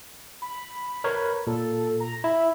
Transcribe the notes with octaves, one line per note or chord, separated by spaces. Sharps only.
B5
A#4 B4 C#5
A#2 A4
A#5
E4 E5